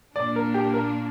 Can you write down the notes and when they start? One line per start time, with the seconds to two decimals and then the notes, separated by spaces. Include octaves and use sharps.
0.16 A#2 A#3 D4 D5
0.36 A#4
0.54 G4
0.74 A#4